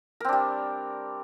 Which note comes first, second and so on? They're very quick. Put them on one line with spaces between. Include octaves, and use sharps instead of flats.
A#4 C4 D4 G3